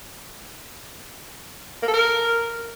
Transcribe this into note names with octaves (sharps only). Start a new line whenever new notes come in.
A#3
A4
A#4